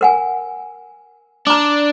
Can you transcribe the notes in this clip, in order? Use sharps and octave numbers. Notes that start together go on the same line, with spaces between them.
A#4 F#5 G#5
D4 A#5 D6